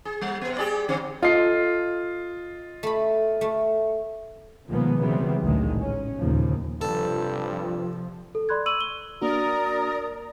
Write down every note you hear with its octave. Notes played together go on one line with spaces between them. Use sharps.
G#4
G3
C3 B3
G4 G#4 D5
D3 C4
F4 A4 D#5 C7
A3 B5
A3
B2 D#3 F3 G#3 A#3 B3
C#3 E3 F#3 G3 B3 C4
A1 D2 A#2 D3 D#3 G#3
C#4
D#2 A#2 C#3 F3
G2 C3 F3 A4
A4
D5 B5 C6 F#6 G#6
C#6 E6 D#7 F#7
G7
A#3 D4 F#4 A#4 D5 A#5 D#6